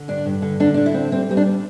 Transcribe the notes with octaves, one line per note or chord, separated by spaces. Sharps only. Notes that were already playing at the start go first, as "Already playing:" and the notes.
Already playing: D3
G2 D4
G2
D3
D3 D4
D3 D4
E4
C4
G3 C4
G3 C4
D4
C4